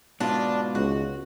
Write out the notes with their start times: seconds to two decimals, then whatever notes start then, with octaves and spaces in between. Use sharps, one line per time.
0.20 G#2 B2 D4 F4
0.75 C#2 F#4